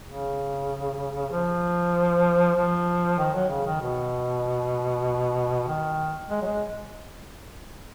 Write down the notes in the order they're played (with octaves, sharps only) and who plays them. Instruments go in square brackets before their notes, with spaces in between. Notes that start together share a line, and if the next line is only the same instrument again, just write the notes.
[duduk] C#3
F3
F3
D#3
F#3
C#3
D#3
B2
D#3
G#3
F#3
G#3